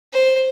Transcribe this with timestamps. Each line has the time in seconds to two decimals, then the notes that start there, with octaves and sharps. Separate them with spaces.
0.13 C5